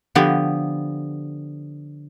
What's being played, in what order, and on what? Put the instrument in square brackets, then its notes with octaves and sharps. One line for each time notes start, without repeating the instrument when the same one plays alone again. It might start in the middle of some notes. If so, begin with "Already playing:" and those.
[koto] D3 F3 B3 G4